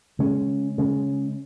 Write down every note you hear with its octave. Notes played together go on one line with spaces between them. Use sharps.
C#3 G#3 C#4
C#3 G#3 C#4